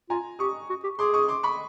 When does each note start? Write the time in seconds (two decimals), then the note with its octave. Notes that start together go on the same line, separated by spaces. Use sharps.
0.10 F4 G#5 A#5
0.39 G4 C#6 D#6
0.70 F#4
0.84 G4
0.99 G#4 C6 D6
1.14 C#6 D#6
1.28 C6 D6
1.43 B5 C#6